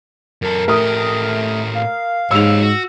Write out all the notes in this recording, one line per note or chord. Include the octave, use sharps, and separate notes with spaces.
F#2 A4 A#4
A2 A3 G4 A#4 D#6
F5
G#2 G4 C#5 E6 F7
F#4